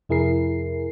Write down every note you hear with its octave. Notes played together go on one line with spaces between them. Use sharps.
F2 C3 E4 G#4 A#4 C7